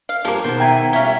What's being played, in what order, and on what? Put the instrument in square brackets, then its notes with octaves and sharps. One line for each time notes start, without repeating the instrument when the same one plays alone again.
[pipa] F5
[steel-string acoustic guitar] G2 G4 G#4 [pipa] F3 A#3
[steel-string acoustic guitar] B2 D#3 [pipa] C5
[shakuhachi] E5 [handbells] G5 A#5 G#6
[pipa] F#3 C#4 [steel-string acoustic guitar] G3 E4 F4